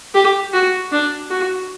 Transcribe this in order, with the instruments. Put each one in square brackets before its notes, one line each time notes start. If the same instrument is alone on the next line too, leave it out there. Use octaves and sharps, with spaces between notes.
[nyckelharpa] G4
F#4
D4
F#4